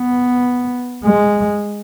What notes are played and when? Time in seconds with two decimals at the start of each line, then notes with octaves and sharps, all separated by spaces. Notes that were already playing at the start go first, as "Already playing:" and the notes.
Already playing: B3
1.04 G#3